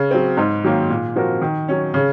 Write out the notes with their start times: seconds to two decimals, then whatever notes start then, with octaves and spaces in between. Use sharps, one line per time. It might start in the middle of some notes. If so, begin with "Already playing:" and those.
Already playing: C#3
0.11 F#3 C4
0.37 G#2
0.64 D#3 F#3 A#3
0.90 A#2
1.16 F3 C4 F#4 A#4
1.42 D#3
1.68 F#3 C#4
1.94 C#3